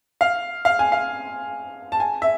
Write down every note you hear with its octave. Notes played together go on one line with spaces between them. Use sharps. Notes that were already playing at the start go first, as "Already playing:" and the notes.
F5
F5
G#5
F5
A5
G#5
E5